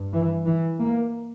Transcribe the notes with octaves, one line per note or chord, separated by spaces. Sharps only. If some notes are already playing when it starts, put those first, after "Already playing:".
Already playing: G2
E3
E3
A#3